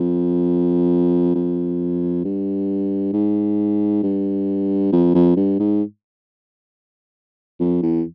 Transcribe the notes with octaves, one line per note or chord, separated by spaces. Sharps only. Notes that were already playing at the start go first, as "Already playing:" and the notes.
Already playing: F2
F2
G2
G#2
G2
F2
F2
G2
G#2
F2
E2